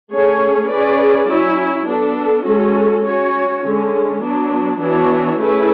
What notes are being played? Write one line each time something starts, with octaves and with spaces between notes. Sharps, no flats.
A3 C#4 G#4 C#5
C#4 G#4 B4 D5
F#3 C#4 E4
B3 D4 A4
G#3 C#4 F#4 A4
C#4 F#4 C#5
D3 G#3 C#4
F#3 B3 D4
E3 B3 D4 F#4 C#5
A3 C#4 E4 G#4 B4